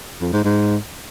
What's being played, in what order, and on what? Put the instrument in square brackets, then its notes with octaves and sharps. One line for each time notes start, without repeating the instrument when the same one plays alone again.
[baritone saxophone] F2
G#2
G#2